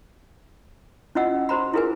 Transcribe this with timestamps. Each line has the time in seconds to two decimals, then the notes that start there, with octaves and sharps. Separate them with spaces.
1.15 C#4 E4 F4 D#5 F#5 E6
1.49 F#4 C5 A#5 B5
1.74 E4 F4 G#4 A#4 B4 G#5